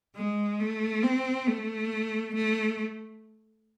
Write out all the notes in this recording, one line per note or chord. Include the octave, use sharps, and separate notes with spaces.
G#3
A3
C4
A3
A3